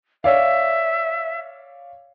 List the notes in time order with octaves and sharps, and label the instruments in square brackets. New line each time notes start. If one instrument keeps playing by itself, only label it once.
[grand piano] C#5 D5 F5 [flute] E5